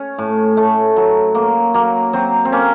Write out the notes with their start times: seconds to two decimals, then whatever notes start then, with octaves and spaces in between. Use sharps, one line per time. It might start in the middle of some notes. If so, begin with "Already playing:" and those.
Already playing: C#4
0.18 A2
0.57 A3
0.96 F#3
1.35 A#3
1.74 F#3 A#3
2.13 F#3 C4
2.45 C4
2.52 A#3 C#4